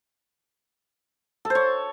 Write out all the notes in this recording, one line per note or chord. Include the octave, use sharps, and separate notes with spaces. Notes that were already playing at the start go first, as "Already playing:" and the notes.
A4
C5
C#5